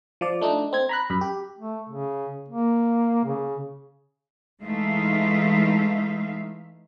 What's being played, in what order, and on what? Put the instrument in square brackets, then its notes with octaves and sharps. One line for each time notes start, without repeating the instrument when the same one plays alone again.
[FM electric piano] F3 D5
A3 D4 D#4
C4 G#6
A#5 B5 F#6
F#2 B5
G4
[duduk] A3
C#3
A#3
C#3
[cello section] E3 G#3 A3 D#4 E5 F5